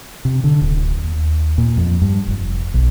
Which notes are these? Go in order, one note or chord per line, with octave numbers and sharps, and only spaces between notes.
C3
D3
D1
D#2
A#2
F2
G2
F1
B1